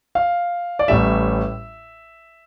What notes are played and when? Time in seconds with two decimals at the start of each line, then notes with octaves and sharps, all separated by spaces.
0.15 F5
0.79 D5
0.88 A1 A2 G3 E5